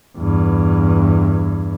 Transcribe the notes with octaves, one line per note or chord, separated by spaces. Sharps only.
E2 G2